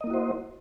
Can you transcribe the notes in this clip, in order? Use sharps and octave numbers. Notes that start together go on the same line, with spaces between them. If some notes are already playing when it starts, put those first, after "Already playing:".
A#3 E4 F#4 C5 D#5